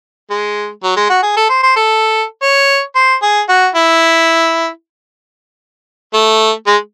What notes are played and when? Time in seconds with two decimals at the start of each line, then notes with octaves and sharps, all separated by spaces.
0.30 G#3
0.83 F#3
0.96 G#3
1.09 F#4
1.23 G#4
1.37 A4
1.49 C5
1.63 C5
1.76 A4
2.43 C#5
2.95 C5
3.22 G#4
3.49 F#4
3.75 E4
6.14 A3
6.67 G#3